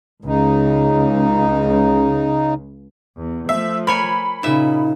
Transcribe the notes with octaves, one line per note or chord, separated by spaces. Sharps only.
C#2 C#3 D#4
E2
F3 A3 E5
A#4 C#5 G#5 B5
A#2 C#3 D#4 E5